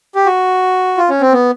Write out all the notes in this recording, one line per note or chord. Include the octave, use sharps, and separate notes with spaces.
G4
F#4
F4
C#4
C4
B3